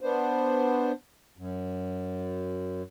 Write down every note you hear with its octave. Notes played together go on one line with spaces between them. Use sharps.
B3 D4 C5
F#2